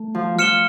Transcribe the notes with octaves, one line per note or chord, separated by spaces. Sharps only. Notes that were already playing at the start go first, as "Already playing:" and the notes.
Already playing: A3
F3
F3 F6 C#7 E7 G7